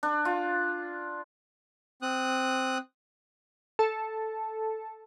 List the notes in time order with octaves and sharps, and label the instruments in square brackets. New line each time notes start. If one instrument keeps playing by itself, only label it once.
[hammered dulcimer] D4
F4
[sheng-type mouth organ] C4 D#6 F#6
[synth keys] A4